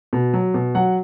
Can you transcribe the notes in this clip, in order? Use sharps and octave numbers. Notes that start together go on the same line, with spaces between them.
B2
F#3
B2
F#3 F#5